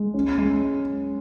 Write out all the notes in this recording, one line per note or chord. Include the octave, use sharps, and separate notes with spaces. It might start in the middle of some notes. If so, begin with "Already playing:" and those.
Already playing: G#3
C#4
G#3